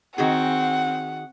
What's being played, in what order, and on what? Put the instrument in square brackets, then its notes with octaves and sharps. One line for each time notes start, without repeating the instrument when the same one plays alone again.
[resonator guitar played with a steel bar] D#3 F#4 G#4 [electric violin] C4 [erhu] F#5